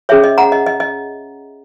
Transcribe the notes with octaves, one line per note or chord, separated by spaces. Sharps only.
C#4 G#4 C#5 E5
D#5
F#5 A#5
D#5
D#5
D#5